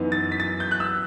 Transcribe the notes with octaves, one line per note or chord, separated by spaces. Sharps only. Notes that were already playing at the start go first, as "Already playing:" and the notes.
Already playing: F#2 E3 B3 D#4
A6
B6
A6
G6
F#6
E6